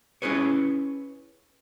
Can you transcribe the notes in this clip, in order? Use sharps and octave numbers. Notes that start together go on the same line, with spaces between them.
C#4 E4 G#4 B4 C#5